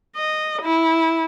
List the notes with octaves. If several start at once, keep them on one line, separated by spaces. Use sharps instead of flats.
D#5
E4